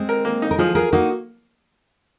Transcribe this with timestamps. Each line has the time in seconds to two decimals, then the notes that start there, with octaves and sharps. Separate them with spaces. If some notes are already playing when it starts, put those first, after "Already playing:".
Already playing: G#3 C4
0.09 A#4
0.25 A#3
0.42 D#4
0.51 A#4
0.58 F3 F4 G#4
0.75 F4 G#4 A#4
0.93 A#3 D#4 F#4